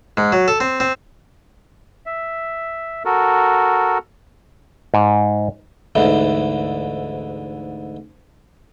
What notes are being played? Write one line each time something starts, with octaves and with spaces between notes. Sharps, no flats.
G#2
F#3
A4
C4
C4
E5
F#4 A4 A#4
G#2
D2 G#2 E3